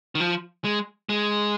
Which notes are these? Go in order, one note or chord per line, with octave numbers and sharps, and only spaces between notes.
D#3
F3
G#3
G#3